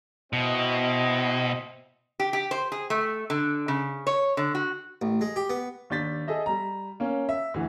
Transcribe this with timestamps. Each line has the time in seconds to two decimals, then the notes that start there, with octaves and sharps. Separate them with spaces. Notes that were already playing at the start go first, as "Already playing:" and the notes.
0.33 B2 C4 E4 D#5
2.20 G4
2.33 G4
2.51 C5
2.72 G#4
2.90 A3
3.30 D3
3.68 C#3
4.07 C#5
4.37 D3
4.55 F#4
5.02 A1
5.21 G#3
5.36 G4
5.50 B3
5.90 D#2 D4 G6 A6 B6
6.28 G#4 A4 D#5 E5
6.46 G3 A#5
7.00 A#3 C#4
7.29 E5
7.54 D2 E3